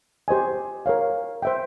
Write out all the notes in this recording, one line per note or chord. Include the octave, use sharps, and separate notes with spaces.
G4 C5 D#5 G#5
A#4 C#5 F5
C5 E5 G5